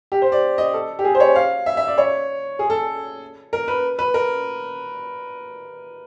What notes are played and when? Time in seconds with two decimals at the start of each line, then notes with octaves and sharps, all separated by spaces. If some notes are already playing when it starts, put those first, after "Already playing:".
0.12 G4
0.22 C5
0.32 D5
0.58 D#5
0.74 A4
0.99 G4
1.04 G#4
1.15 C5
1.20 C#5
1.36 F5
1.66 E5
1.77 E5
1.88 D5
1.98 C#5
2.59 G#4
2.70 A4
3.53 A#4
3.68 B4
3.99 B4
4.14 A#4